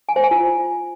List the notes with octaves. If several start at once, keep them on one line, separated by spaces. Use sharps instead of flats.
G#5
C5
G#5
F4